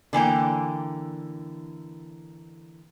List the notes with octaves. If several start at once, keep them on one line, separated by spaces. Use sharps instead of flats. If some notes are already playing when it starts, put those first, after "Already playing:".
D3 E3 A#3 G5